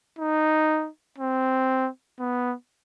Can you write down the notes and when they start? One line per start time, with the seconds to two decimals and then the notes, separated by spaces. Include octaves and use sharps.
0.19 D#4
1.18 C4
2.19 B3